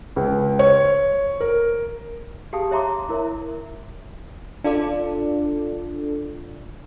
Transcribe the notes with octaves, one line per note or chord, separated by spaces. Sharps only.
C#2
C#5
A#4
G4 G#4 F5 A5 D#6
C#5 E5 A#5 C6 D6
E4 A#4 C#5 E5
D4 F4 A4 D5